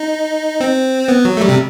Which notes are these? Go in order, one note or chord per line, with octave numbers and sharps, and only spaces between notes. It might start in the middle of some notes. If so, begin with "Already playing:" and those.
Already playing: D#4
C4
B3
F#3
A3
G3
C3